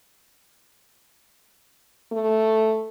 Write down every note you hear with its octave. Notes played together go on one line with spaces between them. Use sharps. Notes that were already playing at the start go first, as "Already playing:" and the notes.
A3